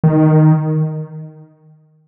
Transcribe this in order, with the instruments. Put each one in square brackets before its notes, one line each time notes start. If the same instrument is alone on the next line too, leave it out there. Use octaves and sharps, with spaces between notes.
[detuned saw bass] D#3